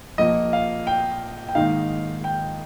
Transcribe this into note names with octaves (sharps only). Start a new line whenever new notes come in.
A#1 A#2 F3 A#3 D#5
F5
G5
G5
G#2 D#3 A#3 D#4 F5
G5